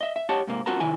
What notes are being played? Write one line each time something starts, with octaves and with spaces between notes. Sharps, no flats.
D#5 E5
E5
G4 C#5 D#5 F#5 A5
G#2 C3 A#3
C4 F4 F#4 A#4 A5 A#5
C3 D#3 E4 G#5